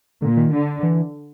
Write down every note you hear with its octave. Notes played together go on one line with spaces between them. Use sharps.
A#2 D3
D#3
D3
E3